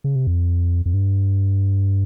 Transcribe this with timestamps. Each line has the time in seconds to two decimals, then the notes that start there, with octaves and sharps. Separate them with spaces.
0.04 C#3
0.15 C3
0.27 F2
0.86 F2
0.94 G2